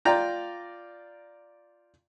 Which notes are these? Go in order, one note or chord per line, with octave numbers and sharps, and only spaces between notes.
F4 D5 G5 A#5